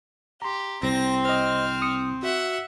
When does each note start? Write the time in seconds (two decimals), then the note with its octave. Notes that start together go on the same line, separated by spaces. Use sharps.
0.42 G4 A#5 C6
0.83 C2 C4 A#6
1.25 C5 D#5 F6
1.82 D#6 C#7
2.23 F#4 E5 F#5